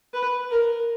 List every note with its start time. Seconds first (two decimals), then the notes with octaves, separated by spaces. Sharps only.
0.14 B4
0.51 A#4